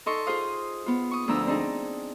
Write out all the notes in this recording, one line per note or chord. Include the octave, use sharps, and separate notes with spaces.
D#4 A4 D#5 C6 C#6
F4 G#4 C5 F5 D#6
B3 F4
C#6 D#6
D2 F3 B3 D4 A#5 E6
C4 D4 D#4 G#4